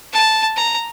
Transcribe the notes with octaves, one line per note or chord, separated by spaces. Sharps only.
A5
A#5